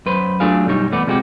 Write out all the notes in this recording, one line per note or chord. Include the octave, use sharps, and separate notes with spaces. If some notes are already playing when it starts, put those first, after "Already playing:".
F#2 B4 C5
F#3 A3 D4 F4 G#4 F5
B1 F#2 G3 D#4 C#5
E2 A3 B3 D5
C3 F3 G#3 C4 F#4 G4